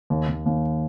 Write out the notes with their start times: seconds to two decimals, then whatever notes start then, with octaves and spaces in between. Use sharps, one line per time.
0.10 D#2
0.28 D#2
0.46 D#2